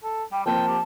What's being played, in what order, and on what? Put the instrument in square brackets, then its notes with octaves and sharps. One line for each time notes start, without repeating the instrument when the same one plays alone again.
[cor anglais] A4
[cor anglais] G3 [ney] G5
[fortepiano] F3 A#3 C4 [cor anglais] G5 [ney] A5
[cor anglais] G4